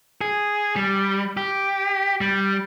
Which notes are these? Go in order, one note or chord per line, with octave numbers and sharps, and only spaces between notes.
G#4
G3
G4
G3